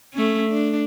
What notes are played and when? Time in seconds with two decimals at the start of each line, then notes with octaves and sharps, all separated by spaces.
0.13 A3 C#4
0.50 D4